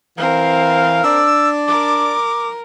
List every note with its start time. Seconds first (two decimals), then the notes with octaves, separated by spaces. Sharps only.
0.18 E3 C4 A#4 F5
1.03 D4 D5 E6
1.68 A#4 D6